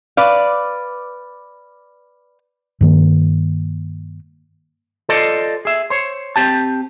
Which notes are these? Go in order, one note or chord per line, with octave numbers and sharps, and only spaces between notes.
B4 D5 F5
G2 D#3 A#3
F4 A4 C5 D5 D#5
G#4 E5
C5 C#5
C4 G4 A5